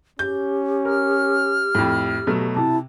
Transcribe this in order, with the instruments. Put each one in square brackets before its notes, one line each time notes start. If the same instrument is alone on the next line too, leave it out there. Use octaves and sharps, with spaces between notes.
[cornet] C#4 [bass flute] G4 [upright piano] G6
[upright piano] A#4 [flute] F6
[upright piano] F2 A2
B2 F#3 A3
[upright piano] C3 [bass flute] E4 [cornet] A5